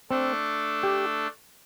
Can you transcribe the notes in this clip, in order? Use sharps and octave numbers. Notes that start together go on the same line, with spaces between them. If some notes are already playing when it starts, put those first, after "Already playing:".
A3 C4 D4 A4
G4